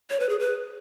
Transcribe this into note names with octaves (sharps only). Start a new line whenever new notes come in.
C#5
B4
G#4
B4